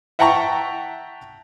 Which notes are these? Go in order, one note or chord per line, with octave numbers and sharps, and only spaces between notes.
E5 F#5 G5 A5 A#5 C#6